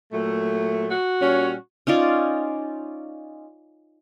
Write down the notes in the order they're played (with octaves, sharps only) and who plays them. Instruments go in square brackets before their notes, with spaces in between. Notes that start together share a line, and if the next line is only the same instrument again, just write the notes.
[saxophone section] A#2 F#3 A3
[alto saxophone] F#4
[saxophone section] A#2 G3 C#4
[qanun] C#4 D#4 F4 D5